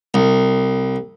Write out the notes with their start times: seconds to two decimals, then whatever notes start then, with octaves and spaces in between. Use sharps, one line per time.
0.14 C2